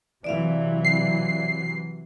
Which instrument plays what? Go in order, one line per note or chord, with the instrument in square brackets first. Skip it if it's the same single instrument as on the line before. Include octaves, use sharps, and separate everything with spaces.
[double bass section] C3 E3 F#3 [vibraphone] D5 E5 F5
[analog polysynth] C7